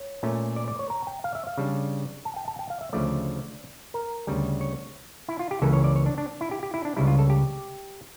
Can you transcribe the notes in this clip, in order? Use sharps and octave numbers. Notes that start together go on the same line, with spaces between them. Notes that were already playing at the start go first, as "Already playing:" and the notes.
Already playing: C#5
A#2 A3 C#4
D5
D5
C#5
A#5
G5
F5
E5
F5
C#3 G3 D4
A5
G5
A5
G5
F5
E5
D2 C#3 F3 A3 D5
A#4
D2 C#3 G3
C#5
E4
F4
G4
C#2 C#3 E3 A#3 C#4 A4
C#5
D5
C#5
D4
D4
E4
G4
G4
E4
D4
C#2 C#3 G3 E4
F4
A4
G4